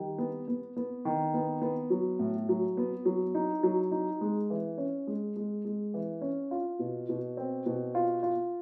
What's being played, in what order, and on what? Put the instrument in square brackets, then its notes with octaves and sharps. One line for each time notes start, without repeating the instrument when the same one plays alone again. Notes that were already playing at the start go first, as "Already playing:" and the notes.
Already playing: [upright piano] D#3 G3
B3
B3
B3
D#3
B3
B3
F#3
A2
F#3
B3
F#3
D#4
F#3
D#4
G#3
E3
C#4
G#3
G#3
G#3
E3
C#4
F4
B2
B2
C4
B2
F4
F4